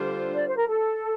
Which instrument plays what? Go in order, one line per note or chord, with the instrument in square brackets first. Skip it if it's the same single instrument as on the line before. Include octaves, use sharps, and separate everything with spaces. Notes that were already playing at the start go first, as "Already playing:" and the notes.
Already playing: [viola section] D3 G3 D4 F4 C5
[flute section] D5
C5
A#4
A4